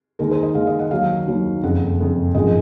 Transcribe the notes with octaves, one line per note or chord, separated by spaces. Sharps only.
D#2 D#3 G#3 A#4
C5
D#5
D#2 D#3 G#3 F5
D#5
F#5
D#2 D#3 F#3 F5
D#2 D#3 F#3
F#1 F2 C#3 F#5
F#1 F2 C#3
G#1 F#2 F3 G#3 D#5